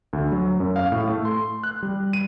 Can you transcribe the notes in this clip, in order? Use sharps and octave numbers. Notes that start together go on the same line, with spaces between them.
D2
F#3
F#2
F5
A2
A3
C6
F#6
G3
D#7